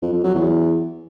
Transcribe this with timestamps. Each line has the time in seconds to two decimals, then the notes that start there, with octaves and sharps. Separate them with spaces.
0.02 F2
0.13 F2
0.24 F#3
0.35 E2